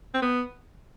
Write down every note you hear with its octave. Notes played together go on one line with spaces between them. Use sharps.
C4
B3